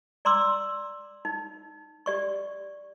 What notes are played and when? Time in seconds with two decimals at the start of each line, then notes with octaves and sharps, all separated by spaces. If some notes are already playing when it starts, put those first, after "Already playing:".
0.25 D5 A#5 C6 D6 E6
1.25 D#4
2.06 G4 D5 C#6